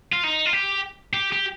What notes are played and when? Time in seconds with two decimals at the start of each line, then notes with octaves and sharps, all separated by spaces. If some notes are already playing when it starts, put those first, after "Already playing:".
0.13 F4
0.24 D#4
0.46 F4
0.53 G4
1.13 G4
1.32 G4